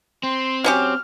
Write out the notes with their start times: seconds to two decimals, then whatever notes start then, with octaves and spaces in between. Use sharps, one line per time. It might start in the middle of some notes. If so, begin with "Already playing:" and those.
0.23 C4 C6
0.64 F#3 C#4 G4 F6